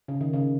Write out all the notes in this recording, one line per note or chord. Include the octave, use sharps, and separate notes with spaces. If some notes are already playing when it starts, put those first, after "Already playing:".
C#3
D#3
C#3